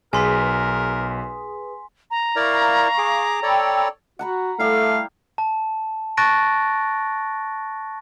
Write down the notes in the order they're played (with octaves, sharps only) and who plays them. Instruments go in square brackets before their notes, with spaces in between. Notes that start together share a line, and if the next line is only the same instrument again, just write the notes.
[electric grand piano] B1 [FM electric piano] G#4 B4 D#6 [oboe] A#4 [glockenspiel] G#5 C6 B6
[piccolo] A#5
[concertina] E4 A#4 D5 [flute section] F5 C#6
[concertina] G#4 D6
[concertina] A4 C#5 D5 [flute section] G5 B5 E6
[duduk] F#4 [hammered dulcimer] F#5 A#5 B5
[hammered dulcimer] G3 E4 [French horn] A3 [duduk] A4 [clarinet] F5
[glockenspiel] A5
A5 C#6 F#6 A6 A#6 D7